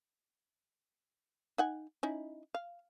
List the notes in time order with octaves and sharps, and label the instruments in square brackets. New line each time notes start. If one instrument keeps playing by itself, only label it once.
[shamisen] D#4 F#5 G#5
C#4 D#4 E4
F5